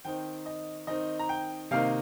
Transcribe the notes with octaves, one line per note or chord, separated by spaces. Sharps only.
D#3 C4 D#4 G5
D#5
D#3 C4 D#4 D#5
A#5
G5
C3 D#3 A#3 D#4 F5